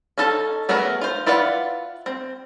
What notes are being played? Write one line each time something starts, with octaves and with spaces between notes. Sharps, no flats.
C#4 D#4 A4 A5
A3 B3 C#4 G#4 A#4
F4 C5
E4 F4 B4 D5 F#5
C4